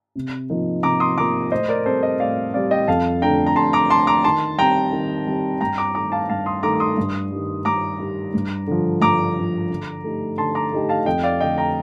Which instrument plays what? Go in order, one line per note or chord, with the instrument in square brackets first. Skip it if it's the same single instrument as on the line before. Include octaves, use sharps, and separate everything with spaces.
[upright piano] C3
F3 A#3 D#4
[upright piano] C3 [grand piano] A#5 D6
[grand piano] C6 D#6
[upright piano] F3 A#3 D#4 [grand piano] A#5 D6
[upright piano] A2 [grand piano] C5 D#5
[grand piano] A#4 D5
[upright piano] G3 C4 [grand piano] A4 C5
[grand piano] C5 D#5
[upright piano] A2 [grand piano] D5 F5
[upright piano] G3 C4 [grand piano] D5 F5
[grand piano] D#5 G5
[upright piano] F2 [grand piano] F5 A5
[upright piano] D3 A3 D4 [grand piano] G5 A#5
[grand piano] A#5
[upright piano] F2 [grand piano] A5 C6
[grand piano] A#5 D6
[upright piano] D3 A3 D4 [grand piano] A5 C6
[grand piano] A#5 D6
[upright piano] D#3 [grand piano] A5 C6
[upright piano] G3 C4 [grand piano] G5 A#5
[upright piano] D#3
G3 C4
[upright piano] G2 [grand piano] G5 A#5
[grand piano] A#5 D6
[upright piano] D#3 A3 [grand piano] A#5 D6
[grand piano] F5 A5
[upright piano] G2 [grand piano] F5 A5
[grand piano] C6 D#6
[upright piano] D#3 A3 [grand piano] A#5 D6
[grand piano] D6
C6 D#6
[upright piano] G2
D#3 G3
[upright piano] G2 [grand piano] A#5 D6
[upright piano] D#3 G3
G2
D3 F3
[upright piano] G2 [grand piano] A#5 D6
[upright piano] D3 F3
D3
A3 D#4 G4
[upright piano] D3 [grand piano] A5 C6
[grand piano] A#5 D6
[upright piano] A3 D#4 G4
[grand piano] F5 A5
[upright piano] F2 [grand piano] D#5 G5
[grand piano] D5 F5
[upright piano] D3 A3 [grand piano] D#5 G5
[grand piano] G5 A#5